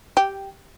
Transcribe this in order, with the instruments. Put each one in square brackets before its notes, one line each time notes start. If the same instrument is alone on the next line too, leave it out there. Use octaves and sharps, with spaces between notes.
[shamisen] G4